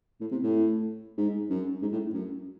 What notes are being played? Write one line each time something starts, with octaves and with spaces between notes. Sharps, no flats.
A2
C3
A2
G#2
F#2
G#2
A2
F#2